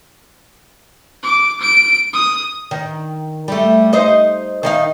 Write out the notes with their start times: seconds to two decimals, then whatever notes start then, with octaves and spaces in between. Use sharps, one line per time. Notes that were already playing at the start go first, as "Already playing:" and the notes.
1.23 D6
1.61 D7
2.13 D#6
2.71 D#3
3.48 G3 A3
3.93 D#4 C5 D#5
4.63 D#3 D#4 F5